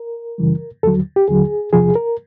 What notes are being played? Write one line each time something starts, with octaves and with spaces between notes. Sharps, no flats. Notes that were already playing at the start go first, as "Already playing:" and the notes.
Already playing: A#4
F#2 C#3 E3 G3
D#2 D3 F#3 A4
G4
D#2 D3 F#3 G#4
E2 C3 F3 G#4
A#4